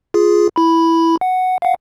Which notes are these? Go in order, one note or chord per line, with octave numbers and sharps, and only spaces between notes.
F4 G#4
E4 B5
F#5
F5 F#5